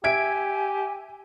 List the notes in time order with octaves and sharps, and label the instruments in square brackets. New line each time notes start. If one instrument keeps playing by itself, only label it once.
[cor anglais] G4 [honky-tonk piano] E5 G#6 D7 [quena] G#5